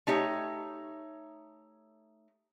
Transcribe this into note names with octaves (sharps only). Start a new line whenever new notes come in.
A3 D#4 G4 C#5